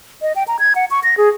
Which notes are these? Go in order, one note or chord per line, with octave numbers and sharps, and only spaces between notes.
D#5
G5
A#5
G#6
F#5
C#6
A#6
G#4